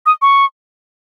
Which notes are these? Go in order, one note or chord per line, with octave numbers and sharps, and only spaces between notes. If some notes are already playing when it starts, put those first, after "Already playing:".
D#6
C#6